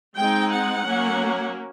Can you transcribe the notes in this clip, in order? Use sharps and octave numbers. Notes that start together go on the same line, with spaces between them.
G#3 C4 D#4 G5
F#5
F#3 A#3 C#4